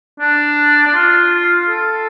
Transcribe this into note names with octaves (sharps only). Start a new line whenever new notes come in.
D4
D4
F4
A4